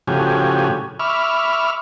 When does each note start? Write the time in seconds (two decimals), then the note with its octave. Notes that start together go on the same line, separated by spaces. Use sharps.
0.07 A2 C#3 F3 F#4 G4 G#5
0.99 E5 B5 C#6 D6 F6